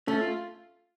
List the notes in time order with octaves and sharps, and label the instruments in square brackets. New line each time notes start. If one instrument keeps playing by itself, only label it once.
[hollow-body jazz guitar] A3 [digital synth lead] C#4
[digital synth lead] F4